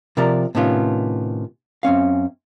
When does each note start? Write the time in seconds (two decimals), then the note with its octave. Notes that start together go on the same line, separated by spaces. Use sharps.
0.17 C3 F3 A#4 D5 A#5
0.55 A2 C3 D#3 B3 C#4 F4
1.83 F#2 C4 C#4 F5